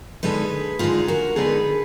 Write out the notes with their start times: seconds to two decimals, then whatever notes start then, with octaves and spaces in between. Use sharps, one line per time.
0.23 D3 G#3 B3 D#4 G#4 B4
0.79 D3 G#3 B3 D#4 F4 G#4
1.08 F#4 A#4
1.36 D3 G#3 B3 D#4 G#4 B4